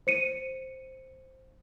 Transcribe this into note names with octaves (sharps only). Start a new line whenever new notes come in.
C5 C#7 D#7